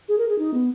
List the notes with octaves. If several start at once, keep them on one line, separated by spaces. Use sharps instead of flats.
G#4
A#4
G#4
D#4
B3